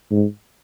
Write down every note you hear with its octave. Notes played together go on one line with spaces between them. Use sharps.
G#2